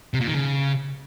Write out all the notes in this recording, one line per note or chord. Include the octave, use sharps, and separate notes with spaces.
C3
A#2
D#3
C#3